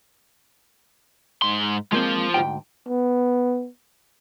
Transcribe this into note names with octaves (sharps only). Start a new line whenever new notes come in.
G#2 C6
G#3 A#3 C4 F4 C5
D2 G#2 G5
B3